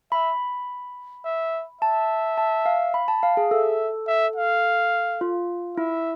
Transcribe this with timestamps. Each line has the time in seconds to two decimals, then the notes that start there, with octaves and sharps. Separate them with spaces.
0.12 E5 B5
1.25 E5
1.81 E5 A5
2.38 A5
2.66 F5
2.94 B5
3.08 A5
3.23 F5
3.37 G#4
3.51 A4 E5
4.07 E5
4.36 F5
5.21 F4
5.76 E4 E5